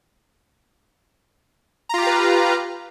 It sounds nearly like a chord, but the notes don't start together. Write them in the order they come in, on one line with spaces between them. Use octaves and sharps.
A#5 F4 G4 F5 B4